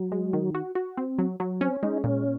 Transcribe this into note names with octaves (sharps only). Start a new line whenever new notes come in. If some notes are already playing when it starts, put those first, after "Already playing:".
Already playing: F#3
G#3
D#3
F#4
F#4
C4
F#3
F#3
C4 C#4
G#3 D#4
A#2 C#4